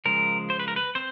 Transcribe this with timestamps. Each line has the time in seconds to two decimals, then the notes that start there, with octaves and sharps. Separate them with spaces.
0.05 C#3 F3 G#3 A#4
0.50 C5
0.59 B4
0.68 A#4
0.76 B4
0.95 C4 C5